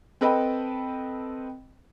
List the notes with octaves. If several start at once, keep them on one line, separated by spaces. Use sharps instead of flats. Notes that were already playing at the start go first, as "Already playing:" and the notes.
C4 A4 B4 D#5 G5 B5